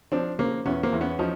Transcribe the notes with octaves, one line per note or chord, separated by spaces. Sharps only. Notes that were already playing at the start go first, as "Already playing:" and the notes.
F3 C4 D4
C#3 A#3 C4
E2 B3 C#4
A#3 C4
E2
B3 C#4
F3 C#4 D#4